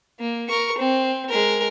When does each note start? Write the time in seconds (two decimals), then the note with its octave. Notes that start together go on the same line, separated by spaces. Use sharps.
0.20 A#3
0.48 A#4 C#6
0.78 C4
1.29 G#3 A#4